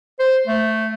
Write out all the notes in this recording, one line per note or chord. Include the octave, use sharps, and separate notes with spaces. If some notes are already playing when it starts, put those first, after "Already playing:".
C5
A3